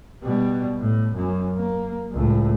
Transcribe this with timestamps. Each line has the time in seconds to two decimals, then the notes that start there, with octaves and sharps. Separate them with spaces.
0.23 B2 G3
0.79 A2
1.15 F#2
1.56 A#3
2.12 C#2 A2